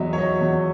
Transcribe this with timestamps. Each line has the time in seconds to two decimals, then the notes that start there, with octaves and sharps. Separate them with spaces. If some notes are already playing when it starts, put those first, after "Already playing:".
Already playing: E2 F#3 D#5 E5
0.13 C#5
0.17 F#3 D#5
0.40 E2